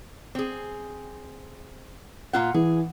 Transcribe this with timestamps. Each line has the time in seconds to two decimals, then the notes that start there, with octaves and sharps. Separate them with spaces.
0.35 C4 G#4
2.33 A#2 F4 F#5
2.54 E3 G#4